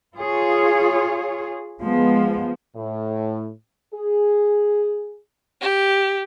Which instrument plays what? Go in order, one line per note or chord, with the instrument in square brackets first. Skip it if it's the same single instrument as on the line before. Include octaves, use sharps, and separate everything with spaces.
[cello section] F4 G#4 C#5
[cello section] F3 [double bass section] G#3 B3
[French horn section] A2
G#4
[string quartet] G4